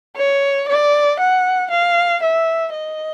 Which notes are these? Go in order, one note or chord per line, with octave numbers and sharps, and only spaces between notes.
C#5
D5
F#5
F5
E5
D#5